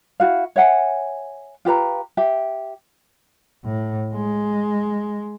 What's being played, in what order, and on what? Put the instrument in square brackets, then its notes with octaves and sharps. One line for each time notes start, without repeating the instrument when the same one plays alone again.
[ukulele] E4 F#4 F5
C#5 E5 F#5 G#5
F4 G4 B4 A#5
G4 E5
[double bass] A2
G#3